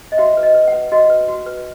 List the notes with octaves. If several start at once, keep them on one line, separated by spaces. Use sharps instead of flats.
D#5
F#4 E5
B4
D#5
B4
F#5
B4
F#4 D#5
B4
F#4
B4